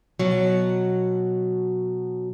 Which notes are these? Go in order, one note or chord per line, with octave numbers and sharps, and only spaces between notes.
B2 F#3